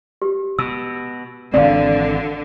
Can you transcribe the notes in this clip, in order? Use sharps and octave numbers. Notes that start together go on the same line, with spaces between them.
G4
B2 E6
G#1 D3 E3 C4 D5 F5